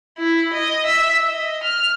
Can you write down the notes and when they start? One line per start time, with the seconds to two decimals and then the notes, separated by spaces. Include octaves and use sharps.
0.19 E4
0.54 D#5
0.86 E5
1.28 D#5
1.64 F6